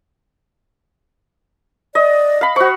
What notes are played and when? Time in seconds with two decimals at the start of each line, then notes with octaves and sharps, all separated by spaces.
1.95 D5 D#5
2.41 F5 B5
2.56 F#4 C5 C#6